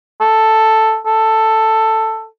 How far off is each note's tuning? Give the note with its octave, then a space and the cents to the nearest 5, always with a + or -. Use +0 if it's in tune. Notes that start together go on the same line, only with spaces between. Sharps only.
A4 +5
A4 +10